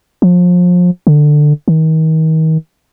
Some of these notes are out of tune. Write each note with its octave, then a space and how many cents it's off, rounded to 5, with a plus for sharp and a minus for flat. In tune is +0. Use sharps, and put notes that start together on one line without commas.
F3 +30
D3 +15
D#3 +35